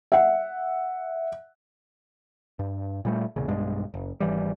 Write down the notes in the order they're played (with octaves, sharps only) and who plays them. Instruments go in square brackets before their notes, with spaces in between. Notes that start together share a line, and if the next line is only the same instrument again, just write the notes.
[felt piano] E5 F#5
[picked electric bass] G2
A#2 G3 A3
E1 A#1 C#3
B1 G2 G#3
F#1
G#1 E3 G3